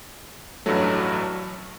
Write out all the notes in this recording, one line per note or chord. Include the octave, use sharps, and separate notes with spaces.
A1 G2 F#3 A3